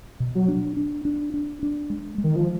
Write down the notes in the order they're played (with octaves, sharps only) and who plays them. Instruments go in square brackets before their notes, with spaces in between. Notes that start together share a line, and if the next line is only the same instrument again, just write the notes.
[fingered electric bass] B2
[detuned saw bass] F#3
[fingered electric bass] D4
D4
D4
D4
D4
G#3
G#3
[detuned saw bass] D#3
F3